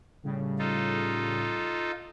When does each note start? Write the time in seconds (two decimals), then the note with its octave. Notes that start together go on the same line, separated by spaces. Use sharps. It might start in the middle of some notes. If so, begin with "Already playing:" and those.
0.23 A2 C#3 G3
0.59 D#4 F4 A4